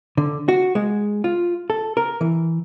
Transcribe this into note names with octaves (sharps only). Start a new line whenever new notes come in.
D3
F#4
G#3
F4
A4
A#4
E3